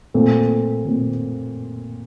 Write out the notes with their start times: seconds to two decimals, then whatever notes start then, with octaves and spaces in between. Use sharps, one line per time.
0.14 A#2 A3 C4
0.85 A#2 A3 C4